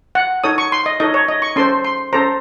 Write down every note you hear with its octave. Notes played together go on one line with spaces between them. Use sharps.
F#5
D#4 A4 C#5 D#6
C#6
C6
D#5
D#4 A4 C#5 D#5
C#5
D#5
C#6
C#4 A4 C5 C6
C6
C#4 A4 C5 A#5